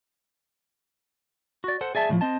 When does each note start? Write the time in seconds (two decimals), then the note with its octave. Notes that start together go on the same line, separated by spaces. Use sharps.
1.64 F#4 D5
1.81 A4 C5 F#5
1.95 G#4 D5 E5 A5
2.09 A2 C#3 F3
2.21 C4 D#5 A5